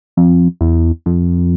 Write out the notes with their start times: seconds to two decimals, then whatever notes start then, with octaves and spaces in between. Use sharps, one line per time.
0.17 F2
0.61 E2
1.06 F2